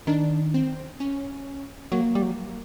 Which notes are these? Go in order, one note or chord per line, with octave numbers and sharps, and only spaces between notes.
D#3 D4
C4
C#4
F#3 A#3
G3
F#3